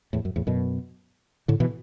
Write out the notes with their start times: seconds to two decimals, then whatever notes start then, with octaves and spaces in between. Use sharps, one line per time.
0.13 E2 A2
0.25 F#2
0.36 E2 A2
0.47 F#2 B2
1.48 A2 D3
1.60 B2 E3